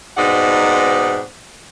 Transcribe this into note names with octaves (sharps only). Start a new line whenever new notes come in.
G#2 B2 C4 D#4 D5 F#5